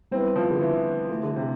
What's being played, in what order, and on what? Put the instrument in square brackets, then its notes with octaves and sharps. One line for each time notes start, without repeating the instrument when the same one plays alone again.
[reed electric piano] G3 B3 E4 B4 [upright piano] C4
[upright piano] F3
D3
E3
[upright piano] E3 [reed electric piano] A3 E4 A4
[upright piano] D3
C3